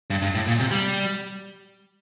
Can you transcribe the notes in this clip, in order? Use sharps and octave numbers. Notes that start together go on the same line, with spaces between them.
G2
G2
A2
A#2
C3
G3